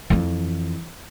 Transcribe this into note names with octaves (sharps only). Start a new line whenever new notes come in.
F2 E3